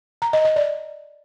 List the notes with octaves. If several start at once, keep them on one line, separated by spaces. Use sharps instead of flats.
A#5
D#5
D#5
D5